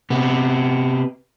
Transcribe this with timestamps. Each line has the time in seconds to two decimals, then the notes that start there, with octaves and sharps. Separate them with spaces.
0.10 C3 B3